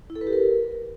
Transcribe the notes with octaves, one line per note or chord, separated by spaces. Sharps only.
E4
A4
B4
G4
A#4